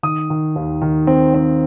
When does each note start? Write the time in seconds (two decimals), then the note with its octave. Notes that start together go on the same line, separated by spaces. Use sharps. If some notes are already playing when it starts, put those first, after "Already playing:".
0.03 D#3 D#6
0.30 D#3
0.56 D#2
0.82 D#3
1.07 C4
1.34 C4